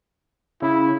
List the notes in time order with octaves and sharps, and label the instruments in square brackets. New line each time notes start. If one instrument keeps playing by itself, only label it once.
[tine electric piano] C#3 [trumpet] E4